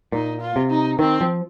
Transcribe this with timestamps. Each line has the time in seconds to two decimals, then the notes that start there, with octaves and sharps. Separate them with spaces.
0.12 A#2 D#4
0.41 F4
0.56 C3
0.70 D#4
0.99 D#3 C4
1.21 F3